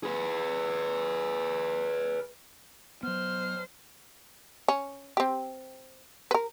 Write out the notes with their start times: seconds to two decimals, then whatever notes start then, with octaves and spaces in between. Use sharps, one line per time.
0.03 G#4 B4
3.03 F#3 B3 C5 F6
4.68 C#4
5.17 C4 G4
6.31 A#4 B4